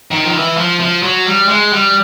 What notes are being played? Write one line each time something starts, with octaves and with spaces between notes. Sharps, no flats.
D#3
F3
E3
F3
F3
F#3
G3
G#3
G3